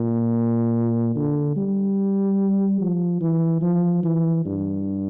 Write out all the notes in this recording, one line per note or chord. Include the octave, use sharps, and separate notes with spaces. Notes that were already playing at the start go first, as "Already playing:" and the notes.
Already playing: A#2
D3
G3
F3
E3
F3
E3
G2